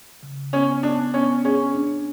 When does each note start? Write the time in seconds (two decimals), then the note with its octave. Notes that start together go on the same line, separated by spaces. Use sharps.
0.23 C#3
0.53 B3 C#4
0.83 B3 D4
1.14 B3 C#4
1.45 C#4 G#4
1.75 D4